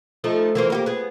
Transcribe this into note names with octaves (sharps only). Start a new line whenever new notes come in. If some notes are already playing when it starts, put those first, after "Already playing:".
F3 A3 D#4
E3 A#3 C4
A#3 F#4 G4
B3 G#4